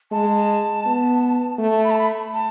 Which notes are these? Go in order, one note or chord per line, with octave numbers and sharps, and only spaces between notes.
G#3 A5
B3
A3 A5
B5
A5
B5
A5